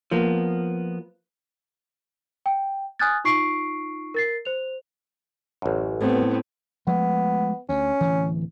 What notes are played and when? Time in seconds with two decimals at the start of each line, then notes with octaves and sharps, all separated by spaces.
0.11 F3 A#3 B3
2.46 G5
2.99 G#5 D#6 F6 F#6 G#6 A6
3.24 D#4 F4 C#6 C7 D7
4.14 A#4 A6 C7
4.45 C5 F7
5.62 A1 F#2
6.01 A2 B3 C4
6.87 F3 G#3 A3 B3
7.69 D2 C#4
8.01 D1 E3